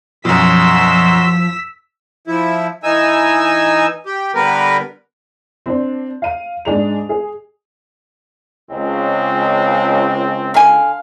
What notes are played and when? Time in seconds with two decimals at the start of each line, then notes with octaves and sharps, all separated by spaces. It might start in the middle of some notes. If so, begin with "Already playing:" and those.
0.25 F#2 B2 F3 F#4 C6 E6 B6
2.27 F3 E4
2.83 E3 D#4 G#5 E6
4.06 G4
4.35 D3 G3 B3 A#4 B4
5.66 C4 D4
6.22 F5 D#7
6.65 G#2 D4 G#4 F7
7.09 G#4
8.70 C#2 C4
10.54 D3 F5 G#5